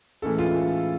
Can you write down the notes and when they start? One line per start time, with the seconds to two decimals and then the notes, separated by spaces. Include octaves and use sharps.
0.22 A2 E3 G#3 C#4 A4
0.39 F4